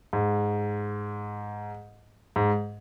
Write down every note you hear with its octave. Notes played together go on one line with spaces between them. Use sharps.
G#2
G#2